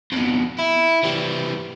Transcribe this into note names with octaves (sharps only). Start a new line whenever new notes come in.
F2 B2
E4
E3 G3